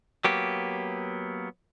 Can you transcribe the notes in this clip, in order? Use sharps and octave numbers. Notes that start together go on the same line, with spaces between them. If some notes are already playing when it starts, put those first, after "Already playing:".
F#3 A#3 B3 G4